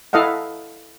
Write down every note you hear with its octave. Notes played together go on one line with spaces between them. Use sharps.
E4 A4 D#5 F5 F#5